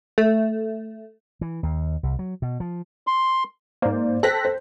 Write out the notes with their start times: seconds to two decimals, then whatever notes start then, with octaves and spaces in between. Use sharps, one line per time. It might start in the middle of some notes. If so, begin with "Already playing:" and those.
0.18 A3
1.41 E3
1.63 D#2
2.03 C2
2.19 F#3
2.42 B2
2.60 F3
3.07 C6
3.82 G#2 A#3 C5 D5
4.23 A4 C5 G5 F#6 A#6 B6
4.45 C5